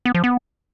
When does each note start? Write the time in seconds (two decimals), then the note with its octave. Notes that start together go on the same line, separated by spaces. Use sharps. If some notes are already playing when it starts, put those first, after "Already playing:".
0.05 B3
0.15 F3
0.24 B3